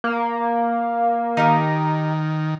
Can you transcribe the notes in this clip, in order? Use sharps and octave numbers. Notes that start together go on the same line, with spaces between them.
A#3
D#3 D#4 G4 A#4